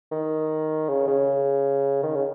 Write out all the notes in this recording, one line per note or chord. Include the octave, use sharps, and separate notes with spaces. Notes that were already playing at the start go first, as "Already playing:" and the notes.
D#3
C#3
C#3
D#3
C#3